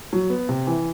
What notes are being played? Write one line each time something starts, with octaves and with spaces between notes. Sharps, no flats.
F#3
B3
C3
E3